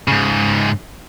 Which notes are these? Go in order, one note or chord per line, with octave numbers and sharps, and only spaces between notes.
G#2 C#3